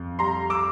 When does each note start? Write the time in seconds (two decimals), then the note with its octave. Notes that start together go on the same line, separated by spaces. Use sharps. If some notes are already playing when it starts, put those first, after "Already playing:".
Already playing: F2
0.19 G3 A#5 C6
0.50 D6 E6